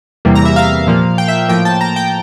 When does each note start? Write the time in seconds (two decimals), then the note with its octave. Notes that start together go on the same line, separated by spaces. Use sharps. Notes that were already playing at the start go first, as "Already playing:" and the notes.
0.25 E2 C3 E3 G3 A#3
0.35 A#5
0.45 E5
0.56 F5
0.87 A#2 F3 A#3
1.18 G5
1.28 E5
1.49 A2 F3 A#3 G5
1.65 A5
1.81 A#5
1.96 G5